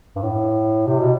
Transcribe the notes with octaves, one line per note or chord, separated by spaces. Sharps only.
G2
A2
C3
B2